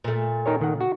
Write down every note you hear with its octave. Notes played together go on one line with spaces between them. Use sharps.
A#2 A3
D#4 A#4 C#5
D#3 F#5
F#4